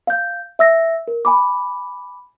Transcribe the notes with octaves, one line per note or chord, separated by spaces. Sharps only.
F5 G6
E5 E6 A#6
A#4
G#5 B5 D6